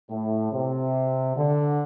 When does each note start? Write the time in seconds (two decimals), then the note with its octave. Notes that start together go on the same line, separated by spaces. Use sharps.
0.10 A2
0.52 C3
1.37 D3